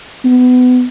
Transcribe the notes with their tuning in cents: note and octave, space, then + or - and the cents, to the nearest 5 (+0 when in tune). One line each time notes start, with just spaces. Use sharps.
B3 +25